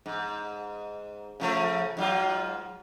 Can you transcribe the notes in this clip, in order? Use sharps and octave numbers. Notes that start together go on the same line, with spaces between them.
G#2
C#3 F3 A3
G#2 F#3 F4